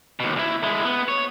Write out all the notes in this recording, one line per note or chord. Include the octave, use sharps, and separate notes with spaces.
D#2 B2
C2 E4
G#3 E4
B3
C#5